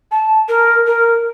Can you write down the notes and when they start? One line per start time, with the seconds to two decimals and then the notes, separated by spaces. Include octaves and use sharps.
0.11 A5
0.48 A#4
0.86 A#4